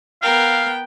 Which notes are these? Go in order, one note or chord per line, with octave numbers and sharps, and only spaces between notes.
B3 A#4 F5 G5